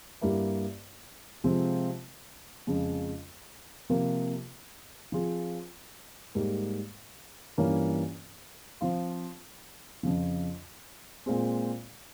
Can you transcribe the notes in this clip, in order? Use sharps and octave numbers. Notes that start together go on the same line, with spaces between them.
G2 G3 A#3 E4
C3 F3 G#3 C4 F4
F2 C#3 F3 G#3
C3 F3 A#3 F4 A#4
F3 C4 F4 G#4
G#2 G3 A#3
G2 E3 A#3 C#4 F4
F3 C4 F4
F2 C#3 F3
A#2 G#3 C4